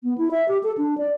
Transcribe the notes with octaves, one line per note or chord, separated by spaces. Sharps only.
B3
E4
E5
G4
A4
D4
D5